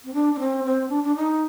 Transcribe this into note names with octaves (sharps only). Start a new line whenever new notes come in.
C4
D4
D4
C4
C4
D4
D4
D#4